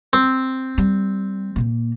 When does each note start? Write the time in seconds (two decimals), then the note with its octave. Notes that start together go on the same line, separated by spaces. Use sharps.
0.13 C4
0.78 G3
1.56 A#2 A#3